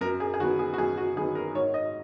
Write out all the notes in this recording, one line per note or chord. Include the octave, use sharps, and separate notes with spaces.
F#2 A#4
G#4
G#4
D#3 F#3 B3 F#4
G#4
F#4
F#2 G#4
F#4
D#3 F#3 B3 G#4
A#4
G#2 C#5
D#5